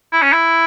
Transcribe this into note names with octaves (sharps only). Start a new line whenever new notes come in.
E4
C#4
E4